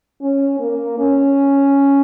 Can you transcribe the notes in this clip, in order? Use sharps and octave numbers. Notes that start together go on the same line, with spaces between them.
C#4
A#3
C#4